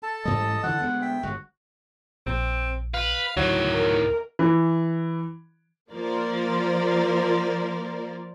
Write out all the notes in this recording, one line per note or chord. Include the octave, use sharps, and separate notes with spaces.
A4 A5
A1 G#2 G3 D#5
D3 E3 F#5
D2 G#3 B3
E5 G5
G1 G#3 F#4
A#1 C4
B4 F5
D2 A2 D#3 F#3
A#4
E3
F3 A#3 F4 A#4 C5 D5